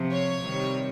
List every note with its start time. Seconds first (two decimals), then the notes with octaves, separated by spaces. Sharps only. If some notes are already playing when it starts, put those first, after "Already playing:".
Already playing: C3 F3
0.11 C#5
0.41 C3 D#3 G3